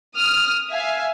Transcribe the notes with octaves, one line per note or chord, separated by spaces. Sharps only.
D#6 F6
E5 F5 G#5